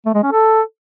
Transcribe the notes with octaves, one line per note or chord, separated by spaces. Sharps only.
A3
G#3
C#4
A4